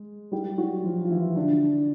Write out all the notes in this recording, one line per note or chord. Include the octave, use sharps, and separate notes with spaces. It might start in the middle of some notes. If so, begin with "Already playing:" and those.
Already playing: G#3
G3 G4
F#3 F#4
F3 F4
F4
E3 E4
D3 D4